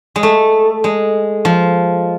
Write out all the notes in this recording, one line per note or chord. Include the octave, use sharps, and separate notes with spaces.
G#3
A3
G#3
F3